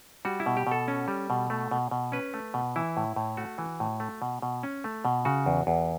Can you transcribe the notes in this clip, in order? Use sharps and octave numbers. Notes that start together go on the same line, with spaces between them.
G3 F#4
E4
B2
G4
B2 A4
C#4
G3
B2
A3
B2
B2
C#4 B4
A3
B2
E3 E4
A2
A2
A3 F#4
E3
A2
A3
B2
B2
C#4
A3
B2
C#3 F#4
E2
E2